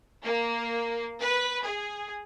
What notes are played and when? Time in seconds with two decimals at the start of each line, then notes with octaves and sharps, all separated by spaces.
0.24 A#3
1.21 B4
1.65 G#4